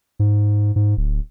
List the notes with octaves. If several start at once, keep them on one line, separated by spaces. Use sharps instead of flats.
G#2
G#2
D1